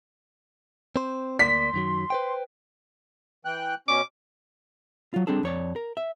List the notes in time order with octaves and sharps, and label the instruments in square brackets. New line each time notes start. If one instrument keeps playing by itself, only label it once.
[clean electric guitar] C4 C5
[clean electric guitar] D2 A#3 D5 [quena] C6 [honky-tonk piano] B6
[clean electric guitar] F#2 D#3 F#3
B4 C5 G5
[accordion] E3 G5 F#6
[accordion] B2 C#4 [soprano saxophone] D6
[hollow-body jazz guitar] F#3 F4
G3 C4 D4 G#4 A4
F2 C#5 D5
A#4
E5